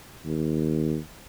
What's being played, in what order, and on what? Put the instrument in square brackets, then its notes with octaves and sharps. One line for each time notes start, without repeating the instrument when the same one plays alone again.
[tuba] D#2